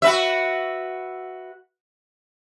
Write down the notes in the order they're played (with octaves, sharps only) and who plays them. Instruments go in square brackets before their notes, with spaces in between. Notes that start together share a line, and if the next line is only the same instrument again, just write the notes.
[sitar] F#4 B4 E5